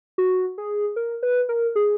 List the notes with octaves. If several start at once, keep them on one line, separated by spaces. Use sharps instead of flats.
F#4
G#4
A#4
B4
A#4
G#4